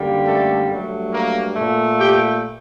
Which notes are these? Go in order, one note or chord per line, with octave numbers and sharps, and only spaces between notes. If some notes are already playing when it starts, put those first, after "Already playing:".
Already playing: F#2 D3 G3 A#3
A3 A4
G2 F#3 A3
A#3 A#4
A#2 A3
G4 G5